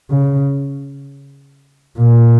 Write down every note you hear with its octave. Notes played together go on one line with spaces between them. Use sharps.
C#3
A#2